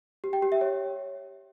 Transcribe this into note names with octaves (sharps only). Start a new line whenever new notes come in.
G4
G5
G4
E5
C#5